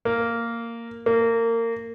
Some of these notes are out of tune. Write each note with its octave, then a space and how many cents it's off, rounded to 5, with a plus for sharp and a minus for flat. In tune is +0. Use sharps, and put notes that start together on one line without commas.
A#3 -10
A#3 -25